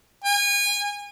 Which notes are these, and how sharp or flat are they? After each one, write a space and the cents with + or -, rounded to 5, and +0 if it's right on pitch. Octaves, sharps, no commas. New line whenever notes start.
G#5 -30